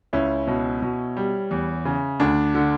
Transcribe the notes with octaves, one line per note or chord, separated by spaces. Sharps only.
C#2 C#4 E4
B2
B2
G3
E2
C#3
D2 D4
D3